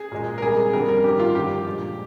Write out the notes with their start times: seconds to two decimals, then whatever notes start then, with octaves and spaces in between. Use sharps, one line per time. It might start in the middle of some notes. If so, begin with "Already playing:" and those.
Already playing: G#4
0.12 A#2 G#3
0.38 A#4
0.42 C3 G3 A#3 G#4
0.73 F2 D3 G3 A#3 A#4
0.89 A#4
1.04 G2 D#3 A#3 G4
1.19 F4
1.35 G2 D3 F3 G4
1.66 A#2 G#3